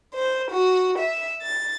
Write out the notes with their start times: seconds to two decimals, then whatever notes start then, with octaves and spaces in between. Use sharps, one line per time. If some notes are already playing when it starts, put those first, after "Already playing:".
0.16 C5
0.52 F#4
0.99 E5
1.43 A6